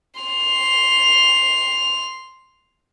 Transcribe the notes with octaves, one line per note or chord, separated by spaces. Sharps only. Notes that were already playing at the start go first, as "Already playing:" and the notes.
C6 F7